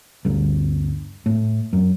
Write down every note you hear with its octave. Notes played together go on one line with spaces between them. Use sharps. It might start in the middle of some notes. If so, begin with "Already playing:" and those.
G1 D2
A2
F#2